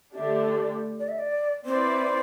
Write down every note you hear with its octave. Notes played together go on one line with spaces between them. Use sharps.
D3 A3 D4 G4 E5
D5
D5
E5
D5
C4 E4 B4 C5 D5